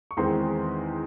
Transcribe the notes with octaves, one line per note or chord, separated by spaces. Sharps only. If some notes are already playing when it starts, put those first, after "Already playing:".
C#6
E2 D#3 G#3 C4 D#4 C6